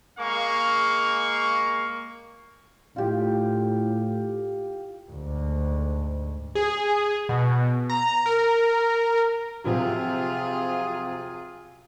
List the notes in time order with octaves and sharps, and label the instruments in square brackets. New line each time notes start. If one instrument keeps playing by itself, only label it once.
[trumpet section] G#3 A#3 F5 C#6
[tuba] A2 [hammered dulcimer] F4 G4
[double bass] D2 G#2
[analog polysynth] G#4
B2
A#5
A#4
[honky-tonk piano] C3 F3 F#3 [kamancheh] F4 G#4